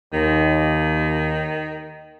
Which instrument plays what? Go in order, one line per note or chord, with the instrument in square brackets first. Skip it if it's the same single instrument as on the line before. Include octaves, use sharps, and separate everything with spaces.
[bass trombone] D#2 [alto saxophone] D#3